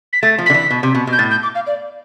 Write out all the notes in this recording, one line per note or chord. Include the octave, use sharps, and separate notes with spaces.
B6
A3 A6
F3
D3 B6
E3
B2
C3
B2
B2
G6
A2 A6
G6
D6
F5
D5